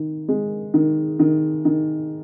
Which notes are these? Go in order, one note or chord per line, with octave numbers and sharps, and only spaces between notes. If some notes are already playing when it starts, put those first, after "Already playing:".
Already playing: D#3
G#3
D#3
D#3
D#3